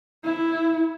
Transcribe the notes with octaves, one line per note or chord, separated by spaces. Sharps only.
E4